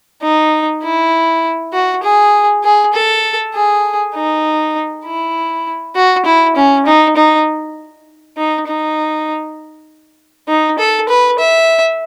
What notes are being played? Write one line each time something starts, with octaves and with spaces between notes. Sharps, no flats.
D#4
E4
F#4
G#4
G#4
A4
G#4
D#4
E4
F#4
E4
C#4
D#4
D#4
D#4
D#4
D#4
A4
B4
E5